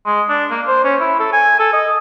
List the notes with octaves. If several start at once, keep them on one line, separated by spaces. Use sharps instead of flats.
G#3
D4
A#3
C5
C#4
E4
A4
G#5
A4
D#5